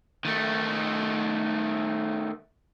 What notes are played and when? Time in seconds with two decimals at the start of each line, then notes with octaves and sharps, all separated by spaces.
0.25 D#3 A3